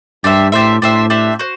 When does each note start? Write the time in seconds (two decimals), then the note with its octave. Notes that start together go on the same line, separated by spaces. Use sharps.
0.24 G2 D4 G4 C5 E5
0.52 A2 D4 G4 C5 E5
0.82 A2 D4 G4 C5 E5
1.10 D4 G4 C5 E5
1.39 F#4 C5